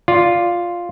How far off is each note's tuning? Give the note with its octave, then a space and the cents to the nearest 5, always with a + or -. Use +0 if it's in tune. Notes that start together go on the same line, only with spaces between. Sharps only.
F4 +0 D5 +0